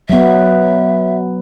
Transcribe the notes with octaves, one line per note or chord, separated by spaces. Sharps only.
F#3 B3 E5